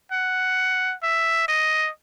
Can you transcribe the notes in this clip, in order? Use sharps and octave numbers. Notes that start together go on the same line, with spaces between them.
F#5
E5
D#5